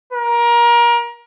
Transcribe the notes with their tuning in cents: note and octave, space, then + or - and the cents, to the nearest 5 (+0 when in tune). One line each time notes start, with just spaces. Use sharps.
A#4 +25